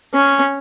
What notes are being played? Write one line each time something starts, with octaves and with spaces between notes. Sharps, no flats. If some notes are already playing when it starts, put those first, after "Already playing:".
C#4